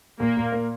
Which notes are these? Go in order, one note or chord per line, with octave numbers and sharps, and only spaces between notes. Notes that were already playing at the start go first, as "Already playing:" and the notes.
A#2 A#3
A#2
A#3